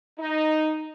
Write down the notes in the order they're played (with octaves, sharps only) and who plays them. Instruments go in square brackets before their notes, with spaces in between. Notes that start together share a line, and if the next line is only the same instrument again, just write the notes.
[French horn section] D#4